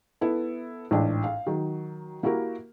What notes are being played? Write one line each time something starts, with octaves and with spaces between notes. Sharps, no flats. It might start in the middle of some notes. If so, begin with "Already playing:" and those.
B3 E4 A4
A1 G#2 D4
F5
D#3 F#3
A#3 E4 F#4 G4 A#4